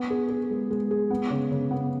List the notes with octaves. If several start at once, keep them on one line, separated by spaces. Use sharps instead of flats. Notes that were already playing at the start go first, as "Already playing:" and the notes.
Already playing: B3
G#4
G#4
G#3
G#3
G#4
B3
C#3
C#3
B3